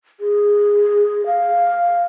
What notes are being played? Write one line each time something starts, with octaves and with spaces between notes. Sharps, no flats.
G#4
F5